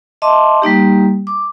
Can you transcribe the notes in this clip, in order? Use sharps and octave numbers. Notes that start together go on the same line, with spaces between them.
D#5 E5 A5 C6 D6
G3 A#3 D#4 G4
D6